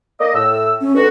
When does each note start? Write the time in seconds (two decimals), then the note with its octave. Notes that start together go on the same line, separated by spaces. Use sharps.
0.20 A#3 D5 D#5
0.34 A2 E6
0.81 C#4
0.96 D2 F#4 B4